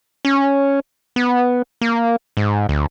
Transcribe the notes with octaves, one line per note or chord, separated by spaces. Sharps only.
C#4
B3
A#3
G#2
D2